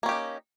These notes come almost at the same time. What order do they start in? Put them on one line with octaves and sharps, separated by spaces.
A#3 C#4 G4 D#4